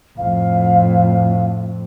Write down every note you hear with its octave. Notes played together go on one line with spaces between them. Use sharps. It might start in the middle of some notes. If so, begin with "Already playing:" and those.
F2 A2 F5